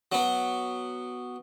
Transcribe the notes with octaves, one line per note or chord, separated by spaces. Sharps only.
F#3 B3